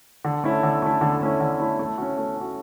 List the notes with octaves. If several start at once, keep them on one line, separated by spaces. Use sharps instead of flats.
D3
A3 C#4 E4
D3
A3 C#4 E4
D3
A3 C#4 E4
D3
A3 C#4 E4
A3
C#4 F#4
A3
C#4 F#4